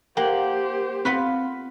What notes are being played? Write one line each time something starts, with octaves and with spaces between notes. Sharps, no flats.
A#3 G4 C5 F#5 G5
B3 C4 F4 B4